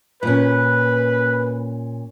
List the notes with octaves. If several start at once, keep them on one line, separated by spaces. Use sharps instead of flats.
A#2 C#4 B4